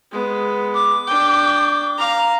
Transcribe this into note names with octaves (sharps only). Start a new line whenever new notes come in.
G#3 B3
D6
D4 G5
F5 A#5